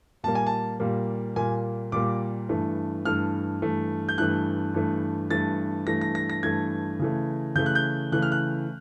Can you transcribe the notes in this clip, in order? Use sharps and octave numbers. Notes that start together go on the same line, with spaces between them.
A#2 G3 A#3 A5
G#5
A5
A#2 G3 A#3
A#2 G3 A#3 G#5
A#2 G3 A#3 D6
G2 E3 A3
G2 E3 A3 F6
G2 E3 A3
G6
G2 E3 A3 F#6
G2 E3 A3
G2 E3 A3 A6
G2 E3 A3 A#6
A#6
A#6
A#6
G2 E3 A3 G#6
C#3 E3 A3
C#3 E3 A3 G6
F#6
G6
C#3 E3 A3 F#6
F6
F#6